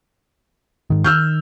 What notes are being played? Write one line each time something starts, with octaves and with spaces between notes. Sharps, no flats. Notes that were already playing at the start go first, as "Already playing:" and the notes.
G#2 D#3
D#3 E6 F6 G6